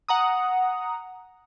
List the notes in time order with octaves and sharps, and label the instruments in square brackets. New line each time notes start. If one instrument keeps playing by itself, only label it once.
[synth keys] F#5 A#5 D#6